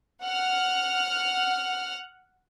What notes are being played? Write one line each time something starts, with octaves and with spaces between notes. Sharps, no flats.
F#5 F6